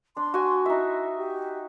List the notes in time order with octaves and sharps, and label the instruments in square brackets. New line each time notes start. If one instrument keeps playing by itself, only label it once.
[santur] D4 [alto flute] C6
[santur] F#4 G#5
[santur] D#4 E5 [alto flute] E4
[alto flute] G4